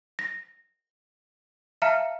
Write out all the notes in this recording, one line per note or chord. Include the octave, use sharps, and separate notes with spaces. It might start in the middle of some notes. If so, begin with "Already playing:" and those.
A#6
E5 F5 A5 A#5 F6 C#7